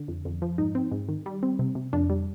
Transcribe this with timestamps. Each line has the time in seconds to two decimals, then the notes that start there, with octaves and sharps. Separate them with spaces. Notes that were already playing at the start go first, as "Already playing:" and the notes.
Already playing: D3
0.08 F2
0.25 F2
0.42 F3
0.58 G#2 D#4
0.75 C4
0.92 G#2
1.09 D#3
1.26 G3
1.43 C4
1.59 C3
1.75 C3
1.93 F2 D4
2.10 G3